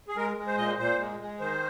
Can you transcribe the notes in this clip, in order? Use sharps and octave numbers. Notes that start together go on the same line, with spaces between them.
G#4
G#3 A#4
G#3
C5
A#2 D#5
C5
A#2 C5
G#3
G#3
D#3 C5